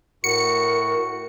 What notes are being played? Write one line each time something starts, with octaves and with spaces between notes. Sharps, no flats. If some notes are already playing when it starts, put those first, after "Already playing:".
A2 F#4 A#4 C#7